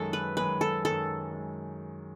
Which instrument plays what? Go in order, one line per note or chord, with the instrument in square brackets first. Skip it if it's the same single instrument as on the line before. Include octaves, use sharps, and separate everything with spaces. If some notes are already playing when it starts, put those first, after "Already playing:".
Already playing: [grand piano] F#2 D#3 G#3 [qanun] A4
[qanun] B4
[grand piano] F#2 D#3 G#3 [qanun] B4
[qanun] A4
[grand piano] F#2 D#3 G#3 [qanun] A4
[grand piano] G#3